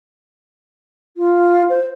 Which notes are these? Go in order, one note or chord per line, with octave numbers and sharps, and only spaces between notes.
F4
C5